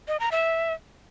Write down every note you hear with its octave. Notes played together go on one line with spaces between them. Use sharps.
D#5
A#5
E5